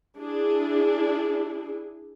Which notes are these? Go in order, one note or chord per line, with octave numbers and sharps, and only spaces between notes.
D4 E4 G#4